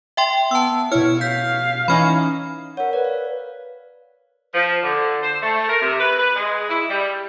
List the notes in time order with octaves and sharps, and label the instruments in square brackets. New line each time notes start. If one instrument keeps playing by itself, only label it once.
[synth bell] E5 G5 C6
[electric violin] B3 [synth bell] A5 E6
[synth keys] B2 C#5 [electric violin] E4 [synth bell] F6
[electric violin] F5 [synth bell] G6 B6
[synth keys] E3 C#4 D#4 [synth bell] B5 F6
[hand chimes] A#4 C#5 [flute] F#5
[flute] B4 [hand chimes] D5
[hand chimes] F5
[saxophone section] F3
D3
C5
A3
A#4
C3
B4
B4
G#3
E4
G3